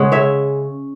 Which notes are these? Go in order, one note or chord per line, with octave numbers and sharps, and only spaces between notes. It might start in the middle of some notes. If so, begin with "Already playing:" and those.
Already playing: C#3 G#3 C#4 F#5
C#5 E5